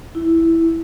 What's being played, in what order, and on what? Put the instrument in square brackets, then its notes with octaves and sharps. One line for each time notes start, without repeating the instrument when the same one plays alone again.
[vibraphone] E4